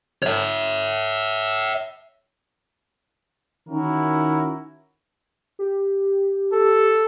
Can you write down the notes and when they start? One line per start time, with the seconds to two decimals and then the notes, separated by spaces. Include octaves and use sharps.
0.23 C#5 E5
3.68 D#3 C#4 E4 F#4 A#4
5.59 G4
6.52 A4